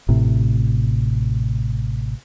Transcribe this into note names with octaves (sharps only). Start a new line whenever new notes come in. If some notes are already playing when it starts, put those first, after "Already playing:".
A1 A2 C3